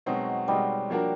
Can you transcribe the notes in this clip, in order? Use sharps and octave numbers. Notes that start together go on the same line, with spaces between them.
B2 F#3 G#3 C4 D#4
B2 G3 G#3 C4 D#4
F3 A#3 D4 F#4 A#4